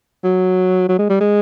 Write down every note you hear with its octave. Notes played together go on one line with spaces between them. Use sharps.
F#3
F#3
G#3
G3
G#3